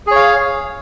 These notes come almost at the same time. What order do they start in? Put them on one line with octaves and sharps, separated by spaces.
G#4 C#5 F5